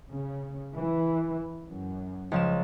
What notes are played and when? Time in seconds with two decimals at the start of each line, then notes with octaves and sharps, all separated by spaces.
0.10 C#3
0.77 E3
1.68 F#2
2.32 C#2 F3 E7